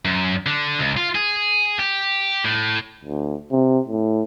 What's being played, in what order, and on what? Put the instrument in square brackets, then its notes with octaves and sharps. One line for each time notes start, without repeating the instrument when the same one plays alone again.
[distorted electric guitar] F#2
D3
C#2
F4
G#4
G4
A2
[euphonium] D2
C3
A2